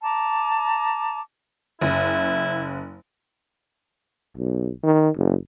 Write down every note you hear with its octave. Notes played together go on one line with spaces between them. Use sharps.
A5 A#5 D6
F#1 E4
B1
D#3
F#1